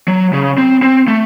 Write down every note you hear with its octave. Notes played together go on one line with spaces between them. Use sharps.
F#3
C#3
C4
C4
A3